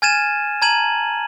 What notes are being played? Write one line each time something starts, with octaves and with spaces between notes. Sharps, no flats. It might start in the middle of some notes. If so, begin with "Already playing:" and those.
G#5 F6 G#6 A6 D#7 E7
A5 A#5 G#6 D#7 F#7